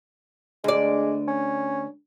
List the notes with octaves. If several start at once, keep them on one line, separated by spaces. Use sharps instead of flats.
D2 G#3 D5
C#4